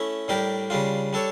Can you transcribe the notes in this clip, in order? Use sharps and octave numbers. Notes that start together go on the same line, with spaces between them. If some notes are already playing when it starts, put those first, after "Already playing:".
Already playing: A3 C#4 E4
A2 G3 D4 G4 A#4
C#3 G3 D4 F4
G3 D4 A4 C#5